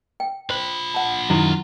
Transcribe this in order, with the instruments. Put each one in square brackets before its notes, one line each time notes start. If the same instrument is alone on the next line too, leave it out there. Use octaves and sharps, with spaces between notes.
[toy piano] G5
[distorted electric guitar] F4 B5 [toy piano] C5
[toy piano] F#5 A5
[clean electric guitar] F#2 D#3 F#3 [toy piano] E4